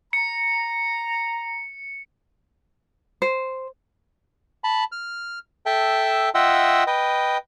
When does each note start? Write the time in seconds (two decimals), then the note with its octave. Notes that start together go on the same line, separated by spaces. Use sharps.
0.13 A#5 C#7
3.22 C5
4.64 A5 B5
4.92 F6
5.66 A4 E5 G5 A5
6.35 F4 D#5 E5 F#5 G5 E6
6.87 B4 D#5 G5